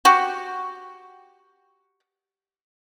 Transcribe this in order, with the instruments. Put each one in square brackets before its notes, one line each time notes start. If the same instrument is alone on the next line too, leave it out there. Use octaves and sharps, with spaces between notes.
[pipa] F#4 G4